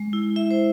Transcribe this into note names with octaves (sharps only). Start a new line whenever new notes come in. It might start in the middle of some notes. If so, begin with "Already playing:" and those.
Already playing: G#3
E4
E4 E5
C5